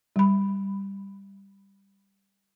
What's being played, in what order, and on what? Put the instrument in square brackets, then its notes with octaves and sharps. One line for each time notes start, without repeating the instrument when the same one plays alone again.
[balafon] G3 B5